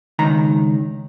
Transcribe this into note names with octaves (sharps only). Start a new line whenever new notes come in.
C#2 D#3 A#5